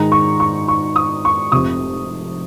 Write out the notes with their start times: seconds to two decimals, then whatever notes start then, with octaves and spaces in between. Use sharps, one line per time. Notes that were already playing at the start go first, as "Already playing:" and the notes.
Already playing: G#2 D#3 G#3 D#4 A#5
0.12 C#6
0.40 C#6
0.68 C#6
0.96 D#6
1.25 C#6
1.52 F1 F2 C3 D#6